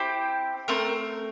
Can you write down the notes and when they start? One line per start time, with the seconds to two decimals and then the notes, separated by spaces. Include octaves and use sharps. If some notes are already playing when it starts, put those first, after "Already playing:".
Already playing: C4 E4 G4
0.68 A3 C4 A#4